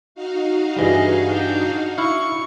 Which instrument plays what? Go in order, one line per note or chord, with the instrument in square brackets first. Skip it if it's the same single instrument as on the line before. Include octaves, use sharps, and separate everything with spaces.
[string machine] D#4 F#4 F5
[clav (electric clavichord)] G2 E3 G3 [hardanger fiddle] G#4 D#5
[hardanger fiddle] D4 G5
[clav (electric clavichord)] E4 F5 [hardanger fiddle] C#6